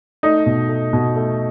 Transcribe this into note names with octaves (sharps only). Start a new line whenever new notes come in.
A3 D#4
B2
A3
B2
A3